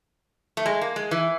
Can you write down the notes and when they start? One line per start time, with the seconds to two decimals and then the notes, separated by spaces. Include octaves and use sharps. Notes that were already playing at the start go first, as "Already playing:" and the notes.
0.57 A3
0.66 G#3
0.81 A#3
0.96 G#3
1.11 E3